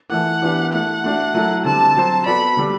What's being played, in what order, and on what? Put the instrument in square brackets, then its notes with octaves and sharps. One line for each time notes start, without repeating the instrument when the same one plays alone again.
[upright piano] E3 A3 E4 A4 [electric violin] F#5
[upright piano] E3 B3 D4 G4
[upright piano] A3 E4 A4 [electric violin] F#5
[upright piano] A3 D4 F#4
F#3 A3 E4 A4
[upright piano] D3 G3 C4 [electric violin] A5
[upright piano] F#3 C4 F#4 C5
[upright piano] B3 F#4 A4 D5 [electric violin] B5
[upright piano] D3 G3 D4